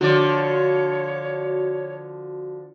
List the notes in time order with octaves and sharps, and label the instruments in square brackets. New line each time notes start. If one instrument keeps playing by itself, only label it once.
[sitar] D3 F3 D5 [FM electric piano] F#4 [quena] C#5